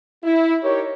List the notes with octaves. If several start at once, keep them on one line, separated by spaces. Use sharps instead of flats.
E4
D#4 G4 A#4 C#5